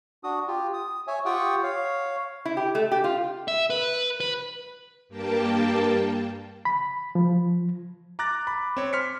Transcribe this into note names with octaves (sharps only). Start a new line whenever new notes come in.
D4 F#4 D#6
F4 G4
D#6
C#5 E5 G#5
F4 G4 F#5 G5 C#6 D#6
C#5 F5
E4
G4
A3
G4
F4
E5
B4
B4
G2 G3 A#3 G5 A5
B5
F3
A#5 D6 F#6 A6 A#6
B5
C4 C#5
C6 F6 B6 C#7